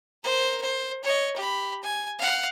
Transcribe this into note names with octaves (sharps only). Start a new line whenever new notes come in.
A#4 C5
C5
C#5 D#5
G4 B5
G#5
F5 F#5